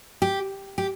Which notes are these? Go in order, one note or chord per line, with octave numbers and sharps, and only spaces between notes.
G4
G4